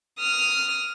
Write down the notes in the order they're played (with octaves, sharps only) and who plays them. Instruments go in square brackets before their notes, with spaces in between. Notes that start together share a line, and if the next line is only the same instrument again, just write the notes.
[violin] D#6 F6